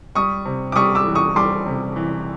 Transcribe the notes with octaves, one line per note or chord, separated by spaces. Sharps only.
G3 C#6 D#6
C3
D6
G3 C#6 D#6
D6 E6
E3
C#6 D#6
G3 C6 D6
C3
E3